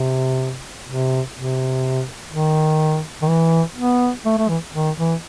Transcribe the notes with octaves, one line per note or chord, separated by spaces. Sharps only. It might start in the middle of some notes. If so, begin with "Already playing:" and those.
Already playing: C3
C3
C3
D#3
D#3
E3
B3
A3
A3
E3
D#3
E3